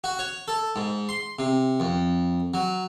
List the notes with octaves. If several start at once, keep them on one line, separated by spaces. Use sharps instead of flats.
F#4
C#5
A4
G#2
C6
C3
F2
F#3